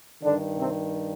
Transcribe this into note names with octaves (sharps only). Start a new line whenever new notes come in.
G2 D3 D#3 D4
C3 C4